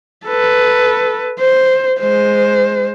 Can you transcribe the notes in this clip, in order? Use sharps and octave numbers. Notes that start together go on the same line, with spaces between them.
A4 B4
C5
G#3 C5